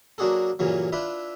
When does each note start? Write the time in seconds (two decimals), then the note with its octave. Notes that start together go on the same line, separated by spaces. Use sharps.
0.18 F#3 A#3 D4 F#4 G#4 A4
0.59 G2 A#2 C#3 E3 F#3
0.92 D4 E4 F4 B4 E5